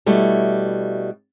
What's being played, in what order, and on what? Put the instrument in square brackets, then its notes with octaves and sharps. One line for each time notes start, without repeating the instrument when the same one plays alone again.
[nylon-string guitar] B2 G3 A3 E4